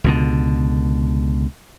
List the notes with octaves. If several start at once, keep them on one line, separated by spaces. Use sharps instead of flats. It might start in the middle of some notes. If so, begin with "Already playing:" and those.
C#2 B2 D3